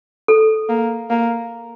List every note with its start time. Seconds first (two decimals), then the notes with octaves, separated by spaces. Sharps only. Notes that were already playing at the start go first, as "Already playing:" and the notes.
0.28 A4
0.69 A#3
1.10 A#3